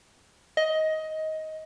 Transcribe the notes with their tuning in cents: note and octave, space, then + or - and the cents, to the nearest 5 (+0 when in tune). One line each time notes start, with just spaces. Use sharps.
D#5 +15